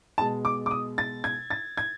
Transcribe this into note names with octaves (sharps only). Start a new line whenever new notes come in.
B2 G#3 A5
D6
D6
D#6
A6
G#6
A6
G#6